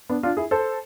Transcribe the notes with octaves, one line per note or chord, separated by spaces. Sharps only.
B3 D4
D4 F4
E4 G#4
A4 C5